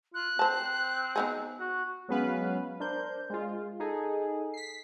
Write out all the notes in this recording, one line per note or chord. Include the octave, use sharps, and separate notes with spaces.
F4 F#6
C4 C5 A5
B3 D#4 G#4
F#4
F#3 G#3 B3 C#4 B4 F5
D4 A#4 C5 G6
G#3 F4
D#4 G#4 A4
B6 C7